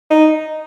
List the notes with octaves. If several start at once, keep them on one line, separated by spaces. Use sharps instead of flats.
D#4